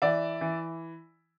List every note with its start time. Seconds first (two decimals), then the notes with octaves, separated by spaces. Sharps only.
0.02 E3 D5 E5
0.41 E3